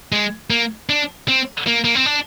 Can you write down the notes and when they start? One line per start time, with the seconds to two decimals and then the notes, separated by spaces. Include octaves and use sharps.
0.12 G#3
0.50 A#3
0.89 D4
1.28 C4
1.67 A#3
1.84 A#3
1.95 C4
2.06 D4